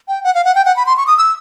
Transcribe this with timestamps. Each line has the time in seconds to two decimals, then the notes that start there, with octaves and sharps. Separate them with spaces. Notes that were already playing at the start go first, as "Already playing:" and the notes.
0.08 G5
0.24 F#5
0.35 F5
0.45 F#5
0.55 G5
0.65 F#5
0.76 B5
0.86 C6
0.97 C#6
1.07 D#6
1.18 E6